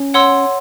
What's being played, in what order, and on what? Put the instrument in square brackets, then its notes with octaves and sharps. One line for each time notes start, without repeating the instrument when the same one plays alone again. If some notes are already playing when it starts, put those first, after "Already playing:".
Already playing: [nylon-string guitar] C#4
[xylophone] C#5 F#5 C6 E6